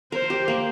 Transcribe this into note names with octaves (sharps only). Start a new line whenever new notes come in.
A#4 C5
G4
A#3